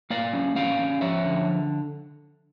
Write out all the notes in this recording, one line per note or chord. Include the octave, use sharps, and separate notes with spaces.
A#3 D5 F5
C#4
C#4 D5 F5
C#4
F3 C#5 E5
D3